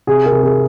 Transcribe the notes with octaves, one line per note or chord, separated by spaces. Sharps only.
C3 G#4
A#4
C3
G#4